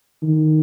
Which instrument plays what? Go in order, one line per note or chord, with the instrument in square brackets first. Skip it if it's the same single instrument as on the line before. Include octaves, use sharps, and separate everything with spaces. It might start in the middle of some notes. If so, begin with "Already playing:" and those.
[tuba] D#3